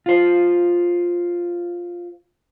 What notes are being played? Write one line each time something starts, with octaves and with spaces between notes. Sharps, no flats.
F4 C5